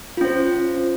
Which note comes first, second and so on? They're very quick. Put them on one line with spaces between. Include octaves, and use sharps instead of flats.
F4 C#4 C5